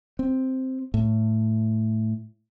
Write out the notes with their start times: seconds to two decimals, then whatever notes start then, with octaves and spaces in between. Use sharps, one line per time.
0.19 C4
0.94 A2